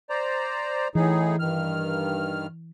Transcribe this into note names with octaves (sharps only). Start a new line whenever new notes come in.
C5 D5 A#5
A2 E3 D#4 G#4
G2 D#3 F6